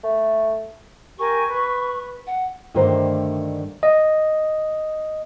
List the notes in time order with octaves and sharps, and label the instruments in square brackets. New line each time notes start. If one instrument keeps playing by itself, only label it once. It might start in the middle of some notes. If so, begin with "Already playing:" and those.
[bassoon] A3
[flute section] G4 A#4 G#5 [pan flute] C#6
[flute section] B4
[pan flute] F#5
[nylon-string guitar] G2 D3 D#3 A3 A#4 C5
[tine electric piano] D#5